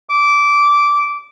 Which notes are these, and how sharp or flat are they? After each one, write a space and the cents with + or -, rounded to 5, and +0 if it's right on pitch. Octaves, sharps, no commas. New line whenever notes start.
D6 -15